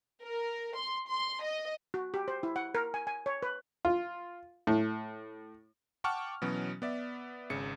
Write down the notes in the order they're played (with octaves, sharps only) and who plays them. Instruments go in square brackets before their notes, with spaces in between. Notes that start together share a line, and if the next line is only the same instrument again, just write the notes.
[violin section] A#4
C6
C6
D#5
[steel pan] F#4
G4
C5
E4
F#5
A#4
G#5
G#5
C#5
B4
[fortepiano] F4
A2
[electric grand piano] F#5 G5 A5 C#6 D6 F6
B2 E3 F#3 B3 C#4
B3 D5 E5
G#1 C#3 C#7